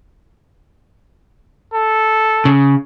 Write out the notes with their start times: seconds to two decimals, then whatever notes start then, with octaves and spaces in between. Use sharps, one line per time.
1.73 A4
2.45 C#3